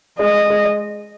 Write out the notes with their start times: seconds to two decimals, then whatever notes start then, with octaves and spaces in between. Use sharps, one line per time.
0.19 G#3 D#5
0.50 G#3